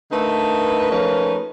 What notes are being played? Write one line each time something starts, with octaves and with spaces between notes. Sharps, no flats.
D3 A3 A#3 D#4 B4
F3 A3 A#3 C#4 D#4 B4